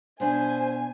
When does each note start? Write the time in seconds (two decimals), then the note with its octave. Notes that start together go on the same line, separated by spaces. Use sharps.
0.20 B2 D4 C5 G#5